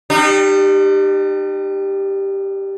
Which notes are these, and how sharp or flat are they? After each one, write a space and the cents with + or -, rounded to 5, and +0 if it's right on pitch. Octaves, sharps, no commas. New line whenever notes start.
G3 +0 D#4 -45